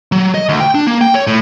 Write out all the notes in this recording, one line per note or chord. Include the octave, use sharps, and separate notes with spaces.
F#3
D#5
D2
G5
D4
A#3
G5
C#5
A2